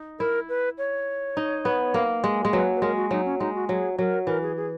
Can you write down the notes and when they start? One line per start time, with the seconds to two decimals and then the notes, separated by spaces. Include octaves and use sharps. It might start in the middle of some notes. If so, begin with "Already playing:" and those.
Already playing: D#4
0.19 E4 A#4
0.49 B4
0.78 C#5
1.37 D#4
1.65 B3
1.94 A#3
2.24 G#3
2.45 G#3
2.53 F#3 B4
2.76 B4
2.82 G#3 A#4
2.96 F#4
3.11 F#3 D#4
3.25 C#4
3.40 G#3 D#4
3.54 F#4
3.69 F#3 G#4
3.98 F#3 A#4
4.27 E3 A#4
4.42 G#4
4.56 G#4